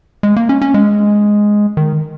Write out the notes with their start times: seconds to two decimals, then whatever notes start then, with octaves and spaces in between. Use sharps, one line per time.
0.23 G#3
0.36 A#3
0.49 C#4
0.61 C#4
0.74 G#3
1.77 D#3